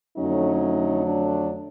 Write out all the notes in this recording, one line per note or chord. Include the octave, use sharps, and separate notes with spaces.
F2 D3 F#3 A3 C#4 D#4
D4